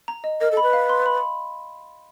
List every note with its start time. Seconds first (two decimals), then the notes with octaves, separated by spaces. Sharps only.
0.08 A#5
0.24 D#5
0.41 A#4 D#5
0.52 A4
0.57 B5
0.63 B4
0.73 F5
0.89 C6
1.06 B5